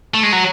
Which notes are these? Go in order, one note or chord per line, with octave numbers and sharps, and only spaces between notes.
A3
G#3
F#3